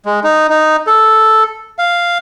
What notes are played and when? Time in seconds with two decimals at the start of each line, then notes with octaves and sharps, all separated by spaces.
0.06 G#3
0.24 D#4
0.50 D#4
0.87 A4
1.79 F5